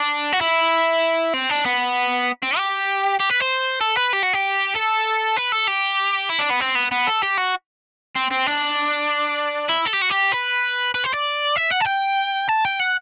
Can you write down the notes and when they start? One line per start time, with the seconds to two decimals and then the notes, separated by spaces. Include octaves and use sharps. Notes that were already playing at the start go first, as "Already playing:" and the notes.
Already playing: D4
0.33 F#4
0.41 E4
1.34 C4
1.49 D4
1.65 B3
2.42 C4
2.57 G4
3.20 G4
3.30 B4
3.40 C5
3.81 A4
3.97 B4
4.13 G4
4.23 F#4
4.33 G4
4.75 A4
5.36 B4
5.52 A4
5.68 G4
6.30 E4
6.39 D4
6.50 B3
6.60 C4
6.75 B3
6.91 B3
7.07 A4
7.23 G4
7.37 F#4
8.15 C4
8.31 C4
8.46 D4
9.69 E4
9.86 A4
9.93 G4
10.02 F#4
10.10 G4
10.32 B4
10.95 B4
11.04 C5
11.14 D5
11.56 E5
11.71 F#5
11.81 A5
11.87 G5
12.49 A5
12.65 G5
12.79 F#5